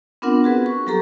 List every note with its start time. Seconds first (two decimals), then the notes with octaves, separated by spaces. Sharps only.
0.22 B3 C4 D4 F4 A#4 F#5
0.44 F#4 G#4 B4
0.66 C#6
0.87 F#3 G3 G4 A4 A#5